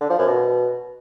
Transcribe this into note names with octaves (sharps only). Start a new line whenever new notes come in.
D3
F3
F#2
B2